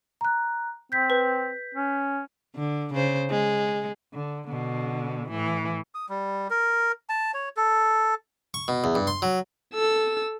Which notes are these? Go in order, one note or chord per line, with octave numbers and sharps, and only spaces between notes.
A#5 F#6
C4 G6 B6
B4
C#4
D3
C#3 C5
G#3
D3
B2 D3
A2 E3
D#6
G3
A#4
A5
C#5
A4
C#6
B2
E2
G2
C6
F#3
A4 E6